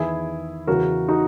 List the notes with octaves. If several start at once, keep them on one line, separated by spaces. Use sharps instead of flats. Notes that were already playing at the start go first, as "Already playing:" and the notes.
Already playing: E2 D#3 E4 G#4
E2 C#3 E3 F#4 A#4
D#4 F#4